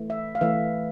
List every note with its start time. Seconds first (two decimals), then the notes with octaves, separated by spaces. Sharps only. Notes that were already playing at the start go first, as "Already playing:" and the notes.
Already playing: E3 A3
0.10 E5
0.35 F5
0.41 E3 A3 E5